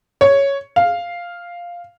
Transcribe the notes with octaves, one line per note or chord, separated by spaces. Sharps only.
C#5
F5